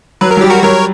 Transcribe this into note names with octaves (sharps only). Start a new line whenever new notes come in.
F#3 B4
A#4
F#3
G3 G4
F#4 A#4
F#3 A#4 C#5